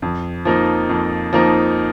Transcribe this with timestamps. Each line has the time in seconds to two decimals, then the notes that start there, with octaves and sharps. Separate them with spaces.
0.02 F2
0.45 F3 A#3 D#4
0.89 F2
1.33 F3 A#3 D#4